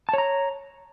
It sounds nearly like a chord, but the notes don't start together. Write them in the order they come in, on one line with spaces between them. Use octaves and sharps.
A5 C#5 A#5